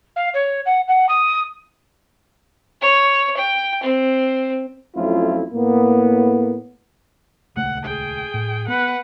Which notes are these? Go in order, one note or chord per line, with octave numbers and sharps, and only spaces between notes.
F5
C#5
F#5
F#5
D#6
C#5
G5
C4
F2 F#3 A3 C#4 E4 F4
A2 A#3 B3
D#1 C#2 A3 F#5
G#4 G5
A2
B3 B4 F#5